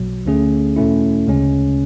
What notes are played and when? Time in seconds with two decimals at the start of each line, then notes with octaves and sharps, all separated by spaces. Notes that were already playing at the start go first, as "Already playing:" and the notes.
Already playing: B1 B2 F#3
0.25 D2 D3 A3 C#4 G#4
0.76 E2 B2 A3 C#4 E4
1.27 D2 C#3 G#3 C#4